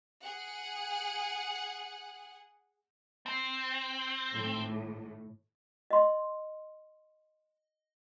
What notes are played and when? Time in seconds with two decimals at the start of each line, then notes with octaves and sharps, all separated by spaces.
0.22 G#4 F#5
3.26 C4
4.33 G#1 A2
5.91 D#5 C6